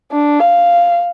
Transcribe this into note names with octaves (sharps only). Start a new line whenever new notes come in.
D4
F5